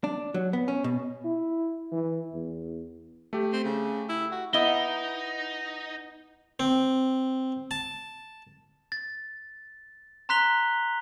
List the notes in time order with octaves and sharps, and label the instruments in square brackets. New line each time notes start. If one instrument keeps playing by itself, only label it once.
[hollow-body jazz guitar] D4
F#3
B3
C#4
B2
[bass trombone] E4
E3
E2
[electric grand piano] A3 G4
[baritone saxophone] C4
C#3
E4
F#4
[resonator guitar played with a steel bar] B3 E4 D#5 [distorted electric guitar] D#4 [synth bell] G7
[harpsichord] C4
A5
[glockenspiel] A6
A#5 C6 F#6 B6 F7 G7